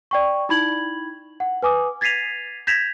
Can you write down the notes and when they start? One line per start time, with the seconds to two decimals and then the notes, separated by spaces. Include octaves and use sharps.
0.11 D5 G5 C#6
0.49 D#4 E4 B5 G#6 F#7
1.40 F#5
1.63 B4 G#5 D6 D#6
2.01 G#6 A6 B6 C7 D#7 F7
2.67 G6 G#6 A#6 B6 E7 F7